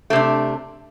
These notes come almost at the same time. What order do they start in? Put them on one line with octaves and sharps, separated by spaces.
A3 C3 D4